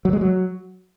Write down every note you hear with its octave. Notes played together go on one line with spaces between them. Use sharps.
F#3
G#3
F#3